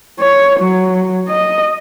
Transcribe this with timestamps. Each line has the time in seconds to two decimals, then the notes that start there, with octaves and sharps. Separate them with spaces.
0.20 C#5
0.60 F#3
1.29 D#5